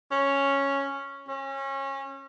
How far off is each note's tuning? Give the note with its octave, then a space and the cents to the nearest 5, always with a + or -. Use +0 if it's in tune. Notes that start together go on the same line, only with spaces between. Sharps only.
C#4 +0
C#4 -25